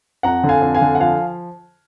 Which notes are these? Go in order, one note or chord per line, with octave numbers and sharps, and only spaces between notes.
F2 F#5 A#5
D3
F5 G#5
F2
F5 G#5
D3
F#5
F3 F5 G#5